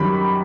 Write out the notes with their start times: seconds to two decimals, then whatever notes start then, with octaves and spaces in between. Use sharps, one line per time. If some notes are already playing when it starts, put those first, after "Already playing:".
Already playing: F#2 D#3 G3 B5